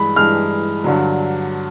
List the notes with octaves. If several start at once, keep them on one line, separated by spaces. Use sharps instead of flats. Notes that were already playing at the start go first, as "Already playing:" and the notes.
Already playing: G2 E3 G#3 B5
G2 E3 G#3 F6
G2 D3 F#3